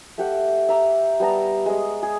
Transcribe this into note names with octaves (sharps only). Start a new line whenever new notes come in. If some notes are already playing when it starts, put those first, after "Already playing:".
A3 G4 F#5 D6
E5 A#5 D6
G3 B3 A5 A#5
G#3 D#5
G#4